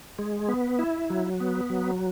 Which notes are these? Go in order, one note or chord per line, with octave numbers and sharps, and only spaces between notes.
G#3
B3
E4
F#3
B3
F#3